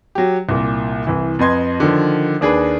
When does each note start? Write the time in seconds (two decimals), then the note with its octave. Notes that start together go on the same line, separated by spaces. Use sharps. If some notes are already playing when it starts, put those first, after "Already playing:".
0.15 F#3 G4
0.49 C2 A#2
1.07 C2 E3
1.39 F2 B4 D#5 C6 G#6
1.80 D3 D#3 F3
2.41 D#2 D4 G#4 B4